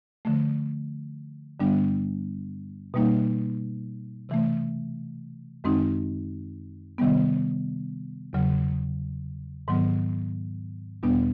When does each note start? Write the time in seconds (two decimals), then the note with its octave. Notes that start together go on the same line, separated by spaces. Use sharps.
0.25 D3 F3 A3
1.60 G2 D3 G3 B3 D4
2.94 B2 G3 A#3 D#4
4.29 C3 E3 A3
5.64 F#2 D#3 G#3 C4 D#4
6.98 C3 D#3 G3 B3
8.33 E2 C#3 F#3
9.68 G#2 D#3 F#3 B3
11.03 E2 B2 G3 B3 D4